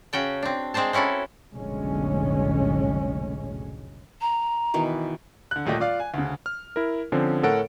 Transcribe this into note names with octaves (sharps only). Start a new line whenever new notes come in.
C#3 C#4 F#4 G5 A5
C4 D4
G#3 C4 D4 C5 A5
C4 C#4 E4 F#4 A4
F1 B1 A2 D3 G#3 C#4
A#5
B2 D#3 E3
D3 F#6
D#1 A#2 A3 G4 D#5
F4 D5 F5
G#5
D2 C#3
F6
E4 A#4
D3 F3 C4 C#4
A2 A4 A#4 C#5 F#5 D7